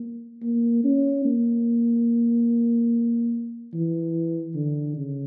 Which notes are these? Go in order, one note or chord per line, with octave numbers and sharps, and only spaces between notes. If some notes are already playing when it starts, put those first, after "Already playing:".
Already playing: A#3
A#3
C#4
A#3
E3
D3
C#3